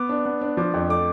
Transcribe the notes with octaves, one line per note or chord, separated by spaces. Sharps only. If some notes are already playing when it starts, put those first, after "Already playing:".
Already playing: B3 D6
D4
B3
D4
F3 D6
F2
A3 D6